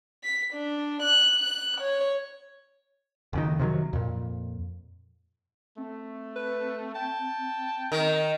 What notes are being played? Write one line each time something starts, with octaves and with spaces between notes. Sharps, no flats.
B6
D4
F#6
F#6
C#5
F#1 F2 D#3
C3 D#3 F3 F#3
F2 A#2
A3 C4
B4
G5 A5
D#3 A#4